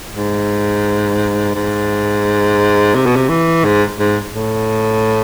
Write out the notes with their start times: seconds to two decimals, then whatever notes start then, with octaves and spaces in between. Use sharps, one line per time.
0.16 G#2
1.55 G#2
2.95 C3
3.06 B2
3.16 C3
3.29 E3
3.65 G#2
3.99 G#2
4.34 A2